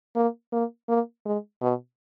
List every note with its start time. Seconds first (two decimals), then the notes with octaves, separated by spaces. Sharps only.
0.16 A#3
0.53 A#3
0.89 A#3
1.26 G#3
1.62 B2